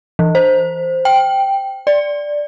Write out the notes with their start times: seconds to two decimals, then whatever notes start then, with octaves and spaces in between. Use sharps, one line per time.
0.19 E3
0.35 C5
1.05 G5
1.87 D5